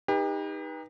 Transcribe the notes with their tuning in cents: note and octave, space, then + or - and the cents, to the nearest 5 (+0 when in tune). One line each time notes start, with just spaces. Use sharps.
D#4 +0 G4 +35 B4 -25